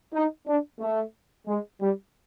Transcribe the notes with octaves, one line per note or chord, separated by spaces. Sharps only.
D#4
D4
A3
G#3
G3